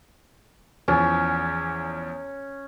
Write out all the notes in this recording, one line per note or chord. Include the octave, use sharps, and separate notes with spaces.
E2 E3 F3 C#4